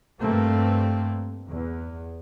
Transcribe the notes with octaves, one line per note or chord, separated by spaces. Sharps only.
G2 A3 A#3 C4
E2